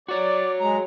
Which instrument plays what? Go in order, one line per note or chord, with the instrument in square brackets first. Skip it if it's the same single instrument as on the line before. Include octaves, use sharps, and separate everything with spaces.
[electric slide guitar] F#4 C#5 [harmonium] D5
[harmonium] G#3 A#5